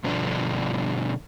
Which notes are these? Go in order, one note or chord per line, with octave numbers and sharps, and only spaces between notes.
G2 B2 D3 F3 D4